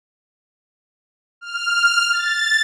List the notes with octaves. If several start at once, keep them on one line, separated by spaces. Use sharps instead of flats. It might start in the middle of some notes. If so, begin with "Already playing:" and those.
F6
A6